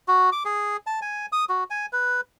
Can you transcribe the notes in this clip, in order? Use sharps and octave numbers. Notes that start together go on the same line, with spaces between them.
F#4
D6
G#4
A5
G#5
D#6
F#4
G#5
B4